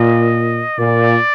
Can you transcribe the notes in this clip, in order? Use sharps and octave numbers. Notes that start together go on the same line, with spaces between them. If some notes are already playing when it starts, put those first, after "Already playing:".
Already playing: A#2 D#5
A#2 D5